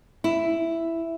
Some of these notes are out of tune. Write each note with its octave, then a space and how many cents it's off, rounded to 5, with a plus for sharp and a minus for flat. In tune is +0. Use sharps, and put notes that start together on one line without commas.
E4 +5